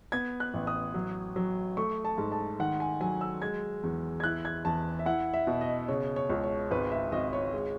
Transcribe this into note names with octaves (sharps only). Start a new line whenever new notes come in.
B3 G#6
F#6
A1
D#6
F#3
F#3
A3 C#6
A5
G#2
A5
D#3 F#5
G#5
F#3 G#5
E6
G#3 G#6
E2
G#6
E4 F#6
G#6
E2 A5
E5
E4 F#5
E5
B2
D#5
C#3 C#5
C#5
C#2
C#5
G#1 B4
E5
G#1 D#5
C#5
G#3